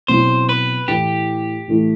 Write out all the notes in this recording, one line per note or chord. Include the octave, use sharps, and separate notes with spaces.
B2 F#3 C4 E4 C5
B4
A2 E3 A3 E4 G4
A2 E3 A3 E4